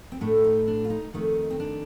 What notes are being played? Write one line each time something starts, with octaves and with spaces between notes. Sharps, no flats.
C4
A2 A3 D4
D#4
D4
F4
D#4
F2 D#3 A3 D#4
C4
D4